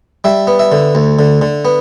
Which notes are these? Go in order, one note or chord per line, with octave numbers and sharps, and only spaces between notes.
G3 E5
B3
E5
D3
D2
D3
D3
B3